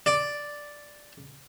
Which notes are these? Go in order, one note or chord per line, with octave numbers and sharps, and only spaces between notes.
D5